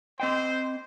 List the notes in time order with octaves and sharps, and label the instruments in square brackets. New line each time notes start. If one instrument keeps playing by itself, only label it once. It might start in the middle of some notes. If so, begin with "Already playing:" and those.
[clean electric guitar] C4 D#5 G5 [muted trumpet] C5